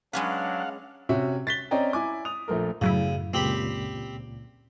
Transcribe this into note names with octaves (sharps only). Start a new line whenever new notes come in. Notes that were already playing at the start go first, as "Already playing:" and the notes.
F#3 G#3 C#4 D4 B4 F5 F#5
C3 C#4 F#4 E5
A6 B6 G7
C4 C#4 D5 D#5 G5 A#5
E4 G#5 D6
D#6 F7
A#1 A3 A#4
F#2 A2 C#3 F#3 E4
C#2 A#2 C4 G4 B5